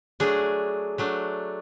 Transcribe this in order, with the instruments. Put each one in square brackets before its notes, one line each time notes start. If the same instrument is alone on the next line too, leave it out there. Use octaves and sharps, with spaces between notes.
[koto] F#3 A3 D4 G#4
F#3 A3 D4